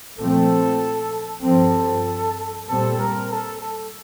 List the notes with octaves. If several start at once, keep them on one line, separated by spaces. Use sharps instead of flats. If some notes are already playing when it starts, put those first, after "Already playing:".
A#2 F3 A3 C4 A4
G2 F3 C4 A4
A#2 G3 C4 A4
A#4
A4
A4